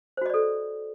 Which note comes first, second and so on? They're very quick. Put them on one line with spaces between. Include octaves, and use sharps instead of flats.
C5 F#4 D#5 D5 A4